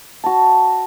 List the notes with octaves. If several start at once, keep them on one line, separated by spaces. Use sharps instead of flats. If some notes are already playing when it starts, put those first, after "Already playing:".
F#4 A5